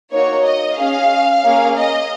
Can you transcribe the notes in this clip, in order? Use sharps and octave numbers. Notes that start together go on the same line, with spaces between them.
A#3 D#4 F#4 C#5
D#5
C#4 G#4 F5
A#3 C#4 G#4
D#5